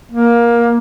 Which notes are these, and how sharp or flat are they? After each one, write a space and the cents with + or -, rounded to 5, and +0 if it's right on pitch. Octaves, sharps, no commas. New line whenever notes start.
A#3 +15